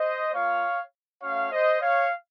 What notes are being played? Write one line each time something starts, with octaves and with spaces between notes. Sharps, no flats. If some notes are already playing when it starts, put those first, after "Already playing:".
Already playing: C5 D#5
A#3 F4 C#5 F5
A3 C#4 F#4 C#5 F5
C5 D#5
C#5 F5